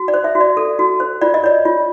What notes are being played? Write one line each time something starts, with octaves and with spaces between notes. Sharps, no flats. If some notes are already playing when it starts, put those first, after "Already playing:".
Already playing: F#4
D5
C5
E5
F#4
D5
A4
F#4
C5
F4 D5
D#5
C#5 D5
F4